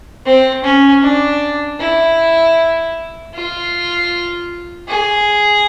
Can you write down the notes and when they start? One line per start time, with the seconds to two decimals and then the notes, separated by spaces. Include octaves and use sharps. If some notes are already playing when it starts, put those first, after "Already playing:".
0.26 C4
0.64 C#4
1.03 D4
1.80 E4
3.34 F4
4.89 G#4